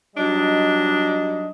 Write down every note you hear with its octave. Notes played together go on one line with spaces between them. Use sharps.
F#3 G3 D4 D#4 D#5